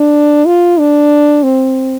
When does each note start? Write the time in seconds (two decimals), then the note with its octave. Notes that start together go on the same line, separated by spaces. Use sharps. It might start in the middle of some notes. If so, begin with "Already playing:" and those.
Already playing: D4
0.47 F4
0.79 D4
1.43 C4